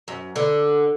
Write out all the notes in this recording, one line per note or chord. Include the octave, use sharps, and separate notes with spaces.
F#2
D3